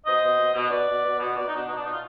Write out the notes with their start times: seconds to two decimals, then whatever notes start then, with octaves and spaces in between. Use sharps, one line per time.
0.04 B2 C5 D#5
0.21 B2
0.37 B2
0.54 B2
0.70 B2 B4 D5
0.87 B2
1.03 B2
1.19 B2
1.35 B2 B4 D5
1.47 D#4
1.52 B2
1.57 D4
1.67 B2 D#4
1.77 D4
1.84 B2 D#4
1.93 F4